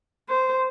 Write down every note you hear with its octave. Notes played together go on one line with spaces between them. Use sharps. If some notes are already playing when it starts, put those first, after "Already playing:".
C5